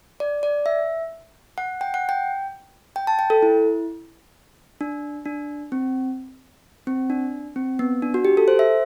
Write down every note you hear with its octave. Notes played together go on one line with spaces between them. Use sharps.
D5
D5
E5
F#5
G5
F#5
G5
G5
A5
G5
A4
E4
D4
D4
C4
C4
D4
C4
B3
D4
F#4
G4
A4
C5
E5